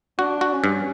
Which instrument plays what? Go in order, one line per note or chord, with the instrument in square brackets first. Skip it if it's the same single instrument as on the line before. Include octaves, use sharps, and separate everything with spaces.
[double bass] D4 [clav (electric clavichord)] F#4
[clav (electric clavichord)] F#4
[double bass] C#4
[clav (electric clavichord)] G2